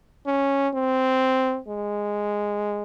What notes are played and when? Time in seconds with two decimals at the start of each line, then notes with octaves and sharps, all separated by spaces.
0.26 C#4
0.74 C4
1.68 G#3